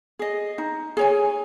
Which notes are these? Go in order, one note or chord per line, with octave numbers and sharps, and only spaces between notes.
G#4 D#5
D#4
G#4 C#5 G#5